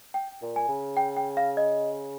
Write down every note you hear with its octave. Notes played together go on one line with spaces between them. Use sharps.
G5
A#2
G#5
C#3
G5
G5
F5
D#5